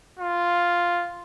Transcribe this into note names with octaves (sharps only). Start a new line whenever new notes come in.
F4